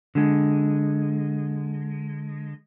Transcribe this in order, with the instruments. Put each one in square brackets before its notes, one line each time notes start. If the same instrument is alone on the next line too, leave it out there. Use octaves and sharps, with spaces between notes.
[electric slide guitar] D3 G#3